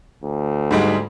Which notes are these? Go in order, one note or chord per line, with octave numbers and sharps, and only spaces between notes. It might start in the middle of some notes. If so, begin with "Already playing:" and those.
D2
G#2 G3 G#3